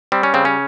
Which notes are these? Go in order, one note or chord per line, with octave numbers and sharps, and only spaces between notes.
G3 C4
C#4
C#3 C4
C#4